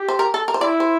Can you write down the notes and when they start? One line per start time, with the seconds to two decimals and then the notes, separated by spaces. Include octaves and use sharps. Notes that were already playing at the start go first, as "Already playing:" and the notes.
Already playing: G4
0.08 C5
0.19 A#4
0.34 A4
0.48 A#4
0.54 C5
0.61 E4 D5
0.80 C5